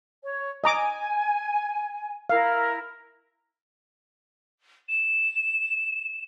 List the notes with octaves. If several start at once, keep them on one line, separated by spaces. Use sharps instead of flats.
C#5
D#5 G#5 A#5 D6
E4 A#4 F5
E7